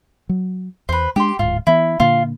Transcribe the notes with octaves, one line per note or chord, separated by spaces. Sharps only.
F#3
E2 B4 C5
G#3 D4 G4 C6
D1 G#2 F4
E3 B3 E4
A#2 D3 A#3 F4